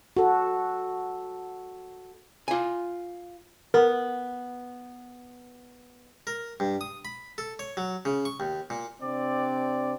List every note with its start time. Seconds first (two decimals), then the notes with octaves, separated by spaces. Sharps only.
0.17 F#4 A4
2.48 F4 G#5
3.74 B3 A#4
6.27 A#4
6.60 G2
6.81 D#6
7.05 B5
7.38 A4
7.59 C#5
7.77 F#3
8.05 C#3
8.25 C#6
8.40 D#2
8.70 A#2
9.02 C3 C4 D4 D5